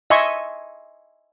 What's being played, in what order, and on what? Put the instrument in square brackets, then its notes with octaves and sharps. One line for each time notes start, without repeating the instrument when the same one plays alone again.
[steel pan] D#5 E5 G#5 C6 C#6